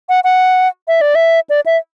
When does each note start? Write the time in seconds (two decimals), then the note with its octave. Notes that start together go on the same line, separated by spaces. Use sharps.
0.09 F#5
0.24 F#5
0.88 E5
1.01 D5
1.15 E5
1.50 D5
1.66 E5